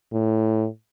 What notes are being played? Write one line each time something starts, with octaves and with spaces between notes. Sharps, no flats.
A2